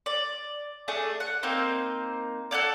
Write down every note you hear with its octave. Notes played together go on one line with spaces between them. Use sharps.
D5
A3 D4 G#4
F#5
A#3 C4 D#4 C5
F#4 A4 C#5 D5